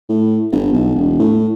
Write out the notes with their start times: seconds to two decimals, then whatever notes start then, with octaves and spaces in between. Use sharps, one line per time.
0.09 A2
0.52 G1
0.73 B1
0.95 E1
1.19 A2